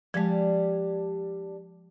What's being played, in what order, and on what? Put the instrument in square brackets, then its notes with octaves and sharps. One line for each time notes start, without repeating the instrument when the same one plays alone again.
[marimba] F3 G#3 [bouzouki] G3 D4